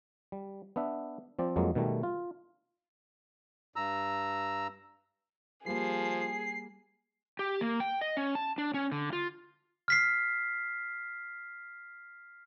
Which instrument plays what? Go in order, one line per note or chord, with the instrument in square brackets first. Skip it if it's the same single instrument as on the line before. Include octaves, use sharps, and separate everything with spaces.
[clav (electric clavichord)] G3
B3 D4 E5
F3 C4 D5
F2 F#3 G#3 A#3
B2 D#3 G3 A3
F4
[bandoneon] G2 A#5 E6
[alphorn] F3 [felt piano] G3 A#3 [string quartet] G#4 [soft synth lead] C7
[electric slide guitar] G4
A#3
G5
D#5
C#4
A5
D4
C#4
D3
F4
[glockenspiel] F6 B6 C7